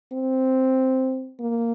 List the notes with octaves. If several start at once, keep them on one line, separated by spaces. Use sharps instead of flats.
C4
A#3